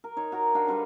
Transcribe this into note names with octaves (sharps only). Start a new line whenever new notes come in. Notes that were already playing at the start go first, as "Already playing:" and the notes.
A#4
D#4 C#5
F#4 A#4 A#5
D4 F4 F#4 G5
D3 G3 B4 C#5